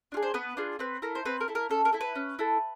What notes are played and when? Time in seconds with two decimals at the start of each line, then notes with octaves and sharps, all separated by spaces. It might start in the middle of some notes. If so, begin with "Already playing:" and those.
0.12 D4 F4
0.17 G#4
0.23 C5
0.34 B3 B4
0.57 D4 F4 G#4
0.79 C4 B4
1.02 E4 A4 A#4
1.15 C5
1.25 C4 B4
1.40 A#4
1.48 E4 A4
1.55 A#4
1.70 C#4 A4
1.85 A#4
1.93 E4 A4
2.01 B4
2.15 C#4
2.39 E4 A4